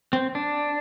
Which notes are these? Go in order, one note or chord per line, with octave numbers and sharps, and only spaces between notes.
C4
D4